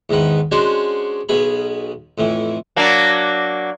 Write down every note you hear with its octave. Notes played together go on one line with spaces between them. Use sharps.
E2 G#2 D#3 B4
G#3 C#4 D4 F#4 C5
B1 B2 G#4 B5
F2 A2 E3
F#3 A#3 D4